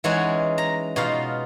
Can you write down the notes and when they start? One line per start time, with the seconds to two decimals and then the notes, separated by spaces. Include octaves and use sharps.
0.04 E3 G#3 C#4 D#4 F#5 G#5
0.58 A#5
0.96 B2 D#4 F4 F5